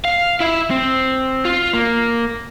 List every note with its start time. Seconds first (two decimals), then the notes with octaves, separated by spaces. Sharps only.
0.05 F5
0.40 E4 E5
0.71 C4
1.45 F4
1.73 A#3